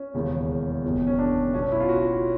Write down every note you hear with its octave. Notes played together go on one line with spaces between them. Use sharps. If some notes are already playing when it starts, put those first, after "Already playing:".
Already playing: C#4
E1 D#2 C#3 E3
F#1 E2 B2
C#4
D4
B1 B2 C#4
E4
F4
F#4